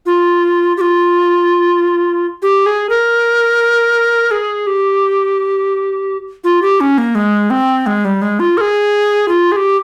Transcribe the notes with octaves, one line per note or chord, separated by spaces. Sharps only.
F4
G4
F4
G4
G#4
A#4
G#4
G4
F4
G4
C#4
A#3
G#3
C4
G#3
G3
G#3
F4
A#4
G#4
F4
G#4
G4